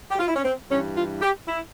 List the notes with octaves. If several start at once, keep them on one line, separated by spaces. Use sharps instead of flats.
G4
F4
E4
C#4
C4
G2 E3 C#4
F4
G4
E4